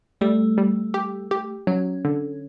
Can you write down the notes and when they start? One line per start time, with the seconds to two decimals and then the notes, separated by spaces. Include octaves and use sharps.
0.21 G3 A3
0.58 G3
0.94 G4
1.31 G4
1.67 F#3 C#4
2.05 D3